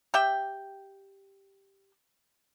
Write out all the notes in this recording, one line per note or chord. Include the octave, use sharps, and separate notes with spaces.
G4 E5 G5